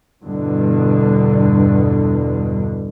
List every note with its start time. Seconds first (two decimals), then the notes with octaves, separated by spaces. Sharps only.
0.24 E2 G2 B2 D3